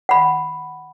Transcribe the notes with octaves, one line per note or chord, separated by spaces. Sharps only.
F#5 B5